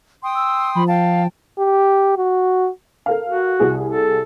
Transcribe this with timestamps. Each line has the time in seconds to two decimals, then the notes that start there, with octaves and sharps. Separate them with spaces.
0.23 G5 C6 D#6
0.35 E6
0.75 F3 B5
0.88 F5 G5 A5
1.59 G4
2.17 F#4
3.06 A4 A#4 F5
3.28 F#4
3.60 C2 G#4
3.89 A4